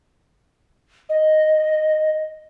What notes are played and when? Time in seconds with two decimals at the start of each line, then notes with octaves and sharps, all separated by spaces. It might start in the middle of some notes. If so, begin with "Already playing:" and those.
1.09 D#5